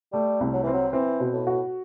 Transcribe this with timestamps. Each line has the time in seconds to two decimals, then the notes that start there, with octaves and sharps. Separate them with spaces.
0.13 G3 A3
0.41 C2
0.53 F#3
0.63 E3 C4
0.73 F#3
0.93 E3 C4
1.20 B2
1.33 A2
1.47 F#4